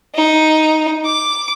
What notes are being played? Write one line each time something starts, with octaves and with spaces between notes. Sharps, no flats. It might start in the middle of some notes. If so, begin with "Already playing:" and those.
D#4
D6